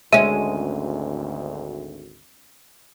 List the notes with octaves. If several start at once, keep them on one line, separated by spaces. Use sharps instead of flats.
G#1 D2 G#3 C#4 E5 D#7